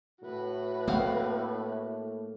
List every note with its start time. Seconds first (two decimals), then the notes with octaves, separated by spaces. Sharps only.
0.22 A2 F#4 B4
0.88 A3 A#3 C4 F5 F#5